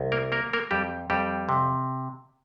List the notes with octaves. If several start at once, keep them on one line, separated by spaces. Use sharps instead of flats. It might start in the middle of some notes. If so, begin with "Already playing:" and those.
Already playing: C2
A#3 A#4
A#3 A#4
A#3 A#4
F2 G3 G4
F2 G3 G4
C3